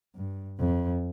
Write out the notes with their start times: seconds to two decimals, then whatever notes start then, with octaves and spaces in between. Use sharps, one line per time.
0.15 G2
0.59 F2